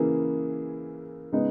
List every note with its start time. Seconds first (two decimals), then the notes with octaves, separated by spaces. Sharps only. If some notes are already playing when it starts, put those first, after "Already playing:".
Already playing: C#3 E3 A#3 E4 G#4
1.32 C#3 G#3 B3 D#4